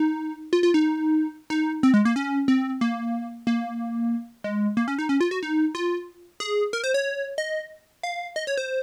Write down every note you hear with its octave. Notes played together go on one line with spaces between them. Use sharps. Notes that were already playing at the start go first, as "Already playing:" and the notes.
Already playing: D#4
F4
F4
D#4
D#4
C4
G#3
A#3
C#4
C4
A#3
A#3
G#3
A#3
C#4
D#4
C#4
F4
F#4
D#4
F4
G#4
A#4
C5
C#5
D#5
F5
D#5
C#5
C5